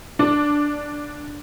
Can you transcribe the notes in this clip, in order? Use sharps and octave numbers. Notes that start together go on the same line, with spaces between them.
D4